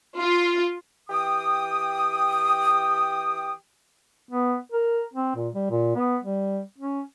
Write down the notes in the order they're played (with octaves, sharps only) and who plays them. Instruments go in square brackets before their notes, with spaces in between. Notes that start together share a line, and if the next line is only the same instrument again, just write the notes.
[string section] F4
[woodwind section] E3 G4 G5 D#6
[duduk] B3
A#4
C4
A#2
G3
A#2
B3
G3
C#4